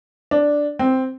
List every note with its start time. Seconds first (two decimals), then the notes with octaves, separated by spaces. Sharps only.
0.31 D4
0.79 C4